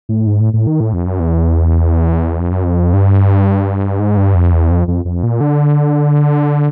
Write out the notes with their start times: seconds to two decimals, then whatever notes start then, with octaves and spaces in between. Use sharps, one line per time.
0.09 A2
0.27 G#2
0.40 A2
0.53 A2
0.67 D#3
0.80 A2
0.93 F2
1.06 F#2
1.20 E2
2.40 F2
2.52 F#2
2.64 F2
2.93 G2
3.99 G#2
4.17 G2
4.35 F2
4.52 E2
4.71 F2
4.88 F2
5.05 F2
5.23 A#2
5.41 D3